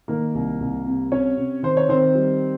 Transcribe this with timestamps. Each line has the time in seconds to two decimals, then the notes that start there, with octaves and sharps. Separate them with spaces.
0.08 D#3 A#3 A#4
0.35 C2
0.60 C2
0.86 C3
1.12 C3 C#4 C#5
1.37 C3
1.63 D#3 C5
1.77 C#5
1.89 D#3 C4 C5
2.15 G3